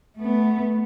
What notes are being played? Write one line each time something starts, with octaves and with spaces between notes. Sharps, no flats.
A3 B3